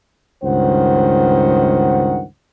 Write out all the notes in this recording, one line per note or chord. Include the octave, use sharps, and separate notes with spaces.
C#2 G2 D#3 C5 F#5